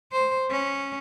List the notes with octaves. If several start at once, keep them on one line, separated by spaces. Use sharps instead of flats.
C5
C#4